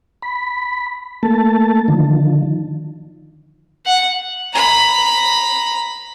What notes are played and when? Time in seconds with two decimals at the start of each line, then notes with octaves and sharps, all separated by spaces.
0.22 B5
1.23 A3 A#3 A5
1.88 D3 D#3 F3
3.86 F#5
4.53 A#5 B5